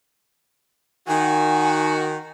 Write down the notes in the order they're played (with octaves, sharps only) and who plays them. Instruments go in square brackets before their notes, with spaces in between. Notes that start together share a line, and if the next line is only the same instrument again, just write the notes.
[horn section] D#3 F#4 [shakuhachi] G#5